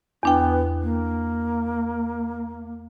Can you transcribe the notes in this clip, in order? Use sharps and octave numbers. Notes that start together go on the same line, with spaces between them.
E2 B3 D4 G5
A#3